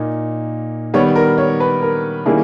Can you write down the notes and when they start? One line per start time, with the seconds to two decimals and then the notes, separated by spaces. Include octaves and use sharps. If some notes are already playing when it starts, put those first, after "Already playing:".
Already playing: A#2 A#3 D#4
0.94 D#3 G3 B3 C#5
1.15 A#4
1.38 C#5
1.60 B4
1.82 A#4
2.26 D#3 G3 A#3 C#4 E4 G#4